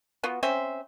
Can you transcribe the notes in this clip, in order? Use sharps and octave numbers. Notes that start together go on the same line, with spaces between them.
B3 F4 F#4
C4 C#4 C5 E5